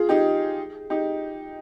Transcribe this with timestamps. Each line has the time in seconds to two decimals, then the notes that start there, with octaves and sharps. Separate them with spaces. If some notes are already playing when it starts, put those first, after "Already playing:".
Already playing: F4 G#4
0.09 D#4 G4
0.90 D#4 G4